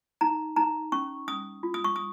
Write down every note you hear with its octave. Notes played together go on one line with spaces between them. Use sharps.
D#4 A#5
D#4 A#5
C#4 C#6
C#4 D#6
F4
D#6
C#6
D#6